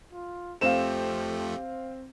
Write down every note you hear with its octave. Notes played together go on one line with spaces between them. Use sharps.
F4
F2 F3 A3 C4 G4 F5 E7